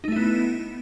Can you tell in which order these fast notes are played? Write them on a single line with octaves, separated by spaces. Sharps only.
D#4 A3 E4 B3